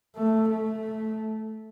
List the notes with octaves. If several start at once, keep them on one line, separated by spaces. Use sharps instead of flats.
A3
A3